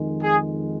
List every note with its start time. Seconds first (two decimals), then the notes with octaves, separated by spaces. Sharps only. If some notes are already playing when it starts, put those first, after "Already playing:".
Already playing: F2 D#3 G#3
0.22 G#4